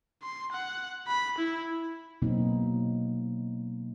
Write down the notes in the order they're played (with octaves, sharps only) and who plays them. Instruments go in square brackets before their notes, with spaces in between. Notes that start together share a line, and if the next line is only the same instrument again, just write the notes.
[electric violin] C6
F#5
B5
E4
[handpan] B2 F#3 A#3 C4 D#4